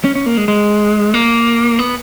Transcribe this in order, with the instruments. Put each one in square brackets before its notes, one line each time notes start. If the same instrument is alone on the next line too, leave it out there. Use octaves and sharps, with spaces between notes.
[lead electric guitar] C#4
C#4
A#3
G#3
G#3
A#3
B3